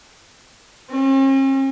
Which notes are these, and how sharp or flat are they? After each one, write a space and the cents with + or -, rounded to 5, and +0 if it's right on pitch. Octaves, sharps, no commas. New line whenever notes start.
C#4 -45